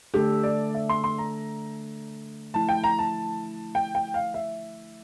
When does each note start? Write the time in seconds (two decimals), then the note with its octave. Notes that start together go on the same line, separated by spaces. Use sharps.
0.14 D3 A3 D4 G4 A4
0.43 D5
0.74 E5
0.89 C6
1.04 C6
1.18 A#5
2.54 F3 A3 E4 A5
2.69 G5
2.84 A#5
2.99 A5
3.75 G5
3.95 G5
4.14 F5
4.34 E5